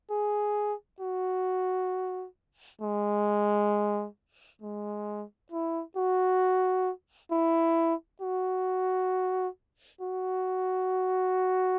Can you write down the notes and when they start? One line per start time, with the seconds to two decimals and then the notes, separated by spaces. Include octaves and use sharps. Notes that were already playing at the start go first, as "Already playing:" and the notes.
0.11 G#4
1.00 F#4
2.81 G#3
4.62 G#3
5.52 E4
5.97 F#4
7.31 E4
8.22 F#4
10.01 F#4